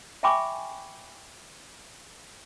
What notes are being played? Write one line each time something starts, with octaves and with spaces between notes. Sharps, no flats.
E5 G5 G#5 B5 C#6 D6